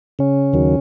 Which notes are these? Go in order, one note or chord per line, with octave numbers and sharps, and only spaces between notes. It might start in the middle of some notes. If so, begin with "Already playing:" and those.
C#3 C#4
D#2 D#3 F#3